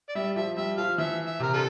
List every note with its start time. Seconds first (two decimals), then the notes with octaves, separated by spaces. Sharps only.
0.09 D5
0.15 G3 E5
0.36 F3 E5
0.57 G3 E5
0.77 F3 F5
0.98 E3 E5
1.27 E5
1.40 C3 A#4
1.54 D4 F4 A4